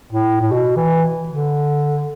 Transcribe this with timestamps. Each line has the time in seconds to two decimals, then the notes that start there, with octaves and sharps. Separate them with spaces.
0.12 A2
0.41 A2
0.52 B2
0.76 E3
1.28 D3